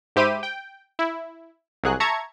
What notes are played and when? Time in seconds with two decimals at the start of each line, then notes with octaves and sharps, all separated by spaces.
0.16 G#2 G4 C5 E5 B5 D#7
0.43 G5
0.99 E4
1.84 C2 F#3 G#4 F#6
2.00 E5 A5 A#5 C#6 G#6 C#7